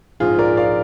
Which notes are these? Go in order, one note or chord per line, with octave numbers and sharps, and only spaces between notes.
A#1 G#2 F3 G#3 F4 G#4
A#4 D5
D5 F5